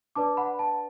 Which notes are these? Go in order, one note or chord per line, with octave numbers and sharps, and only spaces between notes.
D4 B4 D5 A5 D6
F#5 B5
A5